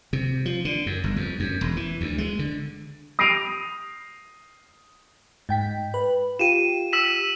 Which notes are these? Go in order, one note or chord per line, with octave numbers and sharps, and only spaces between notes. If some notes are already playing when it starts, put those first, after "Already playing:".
C3
F3
D3
F#2
G1
F2
F#2
E1
E3
D2
G#3
D3
D#6 A#6 C7 D7 D#7 F7
G#2 G5 B6
B4
F4 G4 D#7 E7
E6 B6 E7